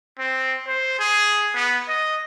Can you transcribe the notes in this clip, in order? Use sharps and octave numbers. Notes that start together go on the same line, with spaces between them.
C4
C5
G#4
B3
D#5